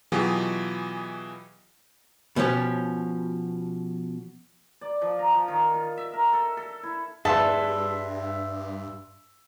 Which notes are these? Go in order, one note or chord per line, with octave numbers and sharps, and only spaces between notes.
B2 E3 F#3 F4 G4 G#4
B2 F3 C#4 G4
D5
F3
A#5
F3
D#3
F4
E5
A#4
A4
A4
E4
G2 G#4 A4 B4 D5 E5 C6